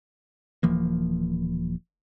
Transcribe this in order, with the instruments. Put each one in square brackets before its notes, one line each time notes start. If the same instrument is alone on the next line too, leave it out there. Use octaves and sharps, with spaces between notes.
[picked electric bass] D#1 E3 F3 A#3